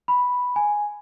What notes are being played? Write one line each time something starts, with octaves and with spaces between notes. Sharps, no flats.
B5
G#5